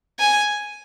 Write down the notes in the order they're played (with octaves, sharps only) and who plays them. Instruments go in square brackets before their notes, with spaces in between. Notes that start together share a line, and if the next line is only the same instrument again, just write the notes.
[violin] G#5